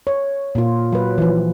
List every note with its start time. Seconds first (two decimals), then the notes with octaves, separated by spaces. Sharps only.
0.07 C#5
0.55 A#2 F4
0.93 F#3 B4
1.18 E3 F3